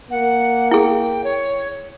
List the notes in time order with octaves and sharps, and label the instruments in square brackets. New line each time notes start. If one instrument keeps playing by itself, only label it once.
[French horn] A#3 [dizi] F#5
[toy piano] E4 G#4 [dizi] G5
[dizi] C#5